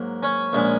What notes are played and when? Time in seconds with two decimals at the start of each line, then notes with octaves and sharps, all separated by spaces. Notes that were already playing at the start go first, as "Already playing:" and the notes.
Already playing: G#2 F#3 A#3
0.23 C#4 C#5
0.53 A#1 A#2 G#3 C#4